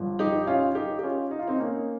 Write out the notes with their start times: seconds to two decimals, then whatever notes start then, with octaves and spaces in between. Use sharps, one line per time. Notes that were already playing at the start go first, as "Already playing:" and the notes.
Already playing: G1 G2 F3
0.19 D#4 G4
0.47 C#4 F4
0.75 D#4 G4
0.99 G4
1.03 C#4 F4
1.31 D#4
1.39 F4
1.47 C4 D#4
1.60 A#3 C#4